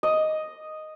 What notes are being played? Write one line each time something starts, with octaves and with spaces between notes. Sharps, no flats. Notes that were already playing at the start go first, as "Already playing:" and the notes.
D#5